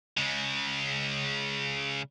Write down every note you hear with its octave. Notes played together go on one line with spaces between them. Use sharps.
C#3 G#3